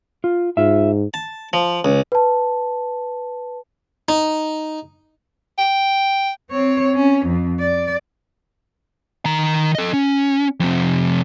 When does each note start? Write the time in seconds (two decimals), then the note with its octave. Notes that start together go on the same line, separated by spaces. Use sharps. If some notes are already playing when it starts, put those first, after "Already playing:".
0.24 F4
0.57 G#2 F4 E5
1.14 A5
1.53 F3
1.85 C#2
2.12 B4 A5
4.09 D#4
5.58 G5
6.50 C4 C#5
6.95 C#4
7.26 F2
7.60 D5
9.25 D#3 A#5
9.75 A4 D#5
9.93 C#4
10.60 F2 C3